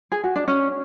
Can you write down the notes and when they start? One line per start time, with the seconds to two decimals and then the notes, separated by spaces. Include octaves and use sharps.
0.12 G#4
0.24 F#4
0.36 D4
0.48 C#4